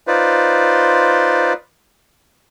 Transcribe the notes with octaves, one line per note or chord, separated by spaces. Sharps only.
D#4 F4 B4 C5 D5